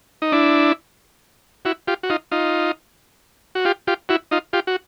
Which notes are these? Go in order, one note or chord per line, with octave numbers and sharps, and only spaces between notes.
D#4
D4 E4
E4 F#4
F4 G4
F#4
D#4 F4
D#4 F4
F#4
F4 G4
F4 G4
E4 F#4
D#4 F4
F4 G4
F#4